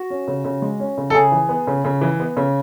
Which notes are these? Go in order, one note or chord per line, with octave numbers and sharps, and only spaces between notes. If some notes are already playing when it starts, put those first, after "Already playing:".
Already playing: F#4
C#4
C#3
C#3
G#3
C#4
C#3
A4
C#3 G#4
E3
B3
C#3
C#3
E3
B3
C#3